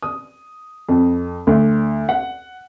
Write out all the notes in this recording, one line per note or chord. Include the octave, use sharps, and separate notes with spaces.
D#6
F2
D2
F#5